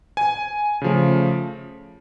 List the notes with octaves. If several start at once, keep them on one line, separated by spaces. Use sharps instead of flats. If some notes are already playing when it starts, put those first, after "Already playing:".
G#5
C#3 F3 A3